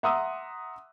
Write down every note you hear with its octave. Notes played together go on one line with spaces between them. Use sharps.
E5 F#5 A#5 C6 D#6 E6